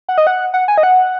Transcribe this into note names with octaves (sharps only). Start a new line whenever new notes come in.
F#5
D#5
F#5
F#5
G#5
D#5
F#5